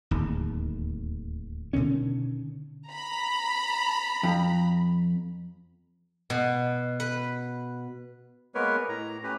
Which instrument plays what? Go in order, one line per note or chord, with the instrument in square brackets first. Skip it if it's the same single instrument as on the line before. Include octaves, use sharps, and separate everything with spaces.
[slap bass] D1 D#2
B2 D3 D#3 C#4
[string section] A#5 B5
[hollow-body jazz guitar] F2
[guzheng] B2
B4
[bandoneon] G#3 A#3 B3 A#4 B4 C#5
A2 A#5
A3 C#4 G4 B4